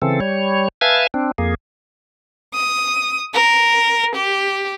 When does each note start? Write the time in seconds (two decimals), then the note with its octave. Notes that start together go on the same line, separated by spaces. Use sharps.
0.02 C#3 E3 C4 A4
0.20 G3 C#5
0.81 B4 E5 F5 G#5 A5 G#6
1.14 C4 D4
1.38 F2 A#3 G#4
2.55 D#6
3.34 A#4
4.16 G4